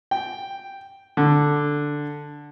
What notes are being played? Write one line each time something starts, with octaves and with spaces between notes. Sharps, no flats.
G5
D3